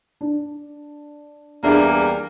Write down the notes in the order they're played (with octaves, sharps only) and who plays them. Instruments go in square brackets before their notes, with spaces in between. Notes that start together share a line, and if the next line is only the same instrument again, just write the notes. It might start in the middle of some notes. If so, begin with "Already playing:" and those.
[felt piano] D4
[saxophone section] E2 G3 A#3 [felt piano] D4 G#4 E5